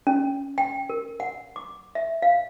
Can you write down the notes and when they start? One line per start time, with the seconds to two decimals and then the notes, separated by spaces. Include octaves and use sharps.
0.07 C#4
0.58 G5
0.90 A#4
1.20 F#5
1.56 D6
1.95 E5
2.22 F5